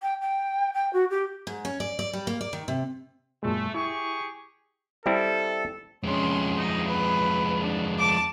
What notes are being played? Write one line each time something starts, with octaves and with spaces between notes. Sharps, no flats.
G5
G5
G5
F#4
G4
G#2
C#4
D5
D5
G3
A#3
D5
D#3
C3
F#2 A#2 G#3 A3
E4 G4 G#4 C#6
G3 C4 E4 A4
F2 G#3 C#4 C6
D#4
B4
D4
A5 D6